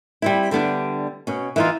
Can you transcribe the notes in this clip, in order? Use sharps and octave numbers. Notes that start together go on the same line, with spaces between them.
G3 C4 E4
D3 G3 B3 D4
B2 C#4
E3 D#4 F4